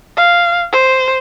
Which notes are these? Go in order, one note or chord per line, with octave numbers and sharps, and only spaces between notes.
F5
C5